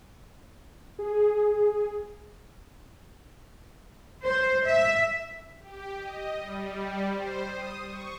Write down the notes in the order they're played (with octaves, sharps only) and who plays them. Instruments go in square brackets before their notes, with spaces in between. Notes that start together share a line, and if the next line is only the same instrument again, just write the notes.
[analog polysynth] G#4
[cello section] C5
E5
[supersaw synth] G4
D#5
G3
C5
D#6
C#6